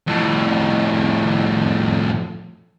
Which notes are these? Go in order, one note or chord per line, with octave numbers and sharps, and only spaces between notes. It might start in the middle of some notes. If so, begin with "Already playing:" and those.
F2 A2